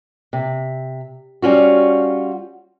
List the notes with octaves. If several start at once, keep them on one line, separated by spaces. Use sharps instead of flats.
C3
G3 C#4 F4 F#4